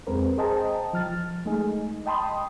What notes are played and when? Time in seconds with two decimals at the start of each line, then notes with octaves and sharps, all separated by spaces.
0.07 F2 G#3 C4 A#4 B4
0.38 G#4 C5 D#5 G5 A5 A#5
0.93 F3 F6 A6
1.46 G#3 A3 D#4 G#4
2.06 D#5 G5 A5 B5 C6 D#6